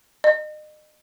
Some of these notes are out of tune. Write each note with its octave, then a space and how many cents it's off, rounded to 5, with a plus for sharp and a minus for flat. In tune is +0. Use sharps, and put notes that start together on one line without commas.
D#5 -35